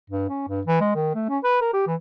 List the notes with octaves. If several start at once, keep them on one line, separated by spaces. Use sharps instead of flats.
G2
C#4
G2
E3
G#3
D#3
A3
C#4
B4
A#4
G4
E3